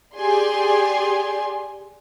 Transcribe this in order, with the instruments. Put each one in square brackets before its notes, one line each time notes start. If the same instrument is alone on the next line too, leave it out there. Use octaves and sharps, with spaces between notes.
[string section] G4 G#4 D5 G#5 C6